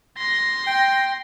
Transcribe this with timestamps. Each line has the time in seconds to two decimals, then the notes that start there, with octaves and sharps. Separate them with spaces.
0.18 C6 A#6
0.67 G5